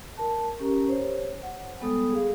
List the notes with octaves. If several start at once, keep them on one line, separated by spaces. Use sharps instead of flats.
A#4 A5
C#4 G4 A#4 A#5
C5 C#5
F#5
G3 G#3 B3 A4 D#6
G#4 F5